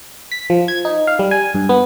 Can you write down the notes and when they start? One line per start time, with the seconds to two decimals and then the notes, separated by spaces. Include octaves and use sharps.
0.32 B6
0.50 F3
0.68 G#6
0.85 D#4
1.07 F5
1.19 G3
1.31 G#5
1.54 G2
1.69 B3